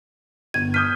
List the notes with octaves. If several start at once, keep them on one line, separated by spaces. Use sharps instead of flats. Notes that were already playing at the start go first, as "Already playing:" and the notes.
G1 G#6 D#7
D#6 F6 G6 B6 D#7